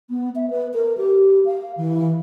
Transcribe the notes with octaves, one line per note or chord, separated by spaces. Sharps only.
B3
E5
B4
A#4
G4
F5
E3